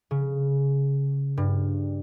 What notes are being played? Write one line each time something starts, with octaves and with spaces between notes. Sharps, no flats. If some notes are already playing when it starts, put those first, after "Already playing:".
C#3
G2